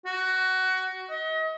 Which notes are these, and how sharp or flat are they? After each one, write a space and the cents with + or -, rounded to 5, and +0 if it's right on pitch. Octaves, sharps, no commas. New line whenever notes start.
F#4 +15
D#5 +35